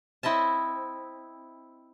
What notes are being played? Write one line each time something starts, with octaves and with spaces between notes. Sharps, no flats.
C4 E4 D#5 E5 A5